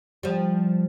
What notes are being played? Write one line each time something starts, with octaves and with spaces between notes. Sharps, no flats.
F3 G3